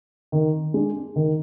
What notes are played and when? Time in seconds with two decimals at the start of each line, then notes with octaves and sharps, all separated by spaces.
0.32 D#3
0.74 G#3 D4
1.16 D#3